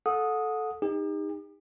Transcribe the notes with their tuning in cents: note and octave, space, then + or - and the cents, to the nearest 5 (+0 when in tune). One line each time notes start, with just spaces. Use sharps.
A4 -15 F#5 -30 D#6 +0
D#4 +0 G4 +45